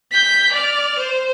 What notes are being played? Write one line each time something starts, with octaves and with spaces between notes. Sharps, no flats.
G6 B6
D5 F6
C5